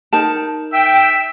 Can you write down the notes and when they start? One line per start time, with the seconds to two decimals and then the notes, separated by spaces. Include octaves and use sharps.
0.13 D#4 A#4 A5
0.73 E5 G5